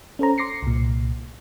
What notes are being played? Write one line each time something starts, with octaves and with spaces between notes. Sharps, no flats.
C#4 A4 C5 A#5
C6 D6 A#6 C7 C#7
C2 A#2